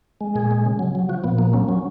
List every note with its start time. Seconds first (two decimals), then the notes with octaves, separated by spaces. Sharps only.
0.21 G#3
0.35 A#2 G#4
0.51 G#3
0.65 C#3
0.79 F#3
0.95 F#3
1.09 F3 F#4
1.24 A#2 B3
1.39 A#3
1.53 F#3 C#4
1.68 F#3 C#4